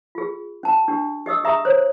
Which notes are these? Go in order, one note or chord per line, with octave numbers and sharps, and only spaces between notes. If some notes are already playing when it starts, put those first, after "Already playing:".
F4 G#4
C#4 A5
D4 G4
G4 D#5 D#6 E6
G4 G#4 E5 A#5 D#6
C5 C#5